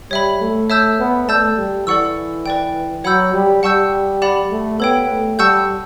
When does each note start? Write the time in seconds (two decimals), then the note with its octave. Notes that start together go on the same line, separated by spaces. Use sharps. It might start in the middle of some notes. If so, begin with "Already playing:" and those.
0.11 G3 C#5 E5 B5
0.41 A3
0.70 C#5 E5 A5 E6 G6
0.99 B3
1.28 A3 D5 A5 E6 G6
1.58 G3
1.87 E3 A4 D5 F#5 C#6 E6
2.46 B4 D5 G5
3.04 F#3 C#5 F#5 B5 E6 G6
3.34 G3
3.63 G3 F#5 A5 C#6 E6 G6
4.22 G4 D5 F#5 B5
4.51 A3
4.80 B3 A4 C#5 G5
5.09 A3
5.39 G3 F#5 A5 C#6 E6 G6